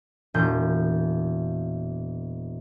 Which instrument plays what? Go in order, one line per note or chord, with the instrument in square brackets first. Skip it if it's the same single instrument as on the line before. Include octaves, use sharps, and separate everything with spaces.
[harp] E1 A#2 G6